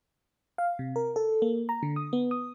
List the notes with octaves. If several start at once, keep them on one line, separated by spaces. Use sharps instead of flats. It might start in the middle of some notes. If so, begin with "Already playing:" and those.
F5
C3
A#4
A4
A#3
A#5
D3
D#6
B3
D#6